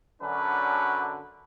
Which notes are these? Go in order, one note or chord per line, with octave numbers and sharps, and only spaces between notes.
F#2 D3 F#3 C#4 D4 B4